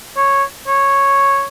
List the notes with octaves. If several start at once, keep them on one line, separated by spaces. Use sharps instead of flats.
C#5
C#5